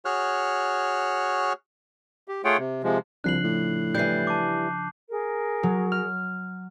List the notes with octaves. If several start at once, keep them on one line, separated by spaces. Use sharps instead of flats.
F#4 G#4 C#5 F6 F#6
G4
A3 F4 G#4 C#5 F#5 G5
C3
C3 F3 G#3
C2 C#3 F3 D4 F#6 C7 F#7
A2
E3 G3 G6 C7
A5 D6
G#4 A#4
F#3
F6